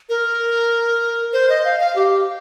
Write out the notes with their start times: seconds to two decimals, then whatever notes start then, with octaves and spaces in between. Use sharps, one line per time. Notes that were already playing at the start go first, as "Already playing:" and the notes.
0.09 A#4
1.33 C5
1.50 D#5
1.65 F5
1.80 F5
1.96 G4